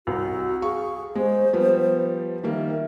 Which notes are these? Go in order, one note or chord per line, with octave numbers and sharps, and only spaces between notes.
C2 F#4
G#4 F5 C#6
G#3 C5
F3 G3 B3
D#3 G3 A#3 E5